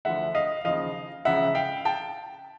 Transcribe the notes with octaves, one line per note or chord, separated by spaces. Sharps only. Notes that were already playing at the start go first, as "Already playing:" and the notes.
D2 D3 F3 E5 F#5
D#5 F5
D#2 C#3 F3 D#5 F5
C#2 C#3 F3 E5 F#5
F5 G5
G5 A5